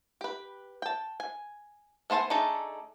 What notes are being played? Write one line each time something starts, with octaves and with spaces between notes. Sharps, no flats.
G4 B4
G5 A5
G#5
A3 B3 C5 G#5 A5
A3 D4 D#4 G#4 A4